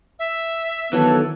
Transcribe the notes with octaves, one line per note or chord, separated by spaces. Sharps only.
E5
D#3 E3 F#3 B3 A4